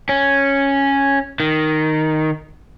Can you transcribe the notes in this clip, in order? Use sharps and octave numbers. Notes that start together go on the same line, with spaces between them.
C#4
D#3